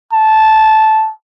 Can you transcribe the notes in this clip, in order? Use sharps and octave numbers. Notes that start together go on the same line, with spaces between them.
A5